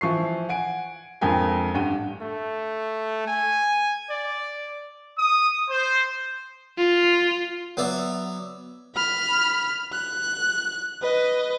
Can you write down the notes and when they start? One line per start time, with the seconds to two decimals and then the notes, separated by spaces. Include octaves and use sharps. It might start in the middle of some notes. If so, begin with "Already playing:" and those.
0.01 E3 F3 C#6 C7
0.49 F#5 G#5 D7
1.21 F2 D3 G#3 A#4 G5 G#5
1.74 A1 G2 F#5 G5 D#7
2.22 A3
3.27 G#5
4.10 D5
5.16 D#6
5.68 C5
6.78 F4
7.77 F#3 B3 D5 E5
8.95 B5 F6
9.92 F#6
11.01 B4 D#5